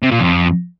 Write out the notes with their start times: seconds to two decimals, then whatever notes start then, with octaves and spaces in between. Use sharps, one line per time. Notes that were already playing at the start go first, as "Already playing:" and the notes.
0.02 C3
0.11 A#2
0.20 F2